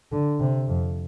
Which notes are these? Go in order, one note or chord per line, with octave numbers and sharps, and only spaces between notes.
D3
C3
F2